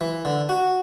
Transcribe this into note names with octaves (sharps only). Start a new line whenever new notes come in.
E3
D3
F#4